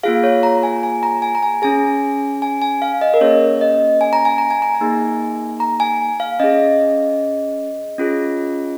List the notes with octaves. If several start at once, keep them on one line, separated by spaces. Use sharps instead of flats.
A#3 F4 G#4 F5
C#5
A#5
G#5
G#5
A#5
G#5
A#5
G#5
C#4 G#4 G#5
G#5
G#5
F5
D#5
A#4
A#3 C#4 G#4 C#5
D#5
G#5
A#5
G#5
A#5
G#5
A#5
G#5
A#3 D#4 G#4
A#5
G#5
F5
C#4 G#4 D#5
C#4 F4 G#4